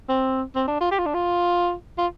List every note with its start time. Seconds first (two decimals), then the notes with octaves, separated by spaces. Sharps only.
0.09 C4
0.55 C4
0.67 D4
0.80 F4
0.91 G4
0.98 F4
1.06 D4
1.14 F4
1.98 F4